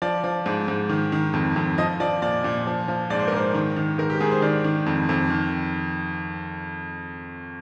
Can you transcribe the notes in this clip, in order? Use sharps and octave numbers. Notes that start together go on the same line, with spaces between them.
F3 D5
F3
G#2
G#2
D#3
D#3
F2
F2
F3 D#5
F3 D5
A#2 D5
A#2
F3
F3
G#2 D5
C5
A#4
G#2 C5
D#3
D#3
G#2 A#4
G4
G#2 G#4
C5
D#3 D5
D#3
F2
F2
D#3